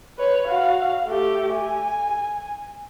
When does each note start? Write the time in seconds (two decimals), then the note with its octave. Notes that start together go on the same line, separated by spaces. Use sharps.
0.19 B4 C#5
0.48 F#4 F5
1.06 A3 G4
1.54 G#5